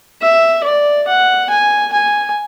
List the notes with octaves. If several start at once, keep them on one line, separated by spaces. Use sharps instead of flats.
E5
D5
F#5
G#5
G#5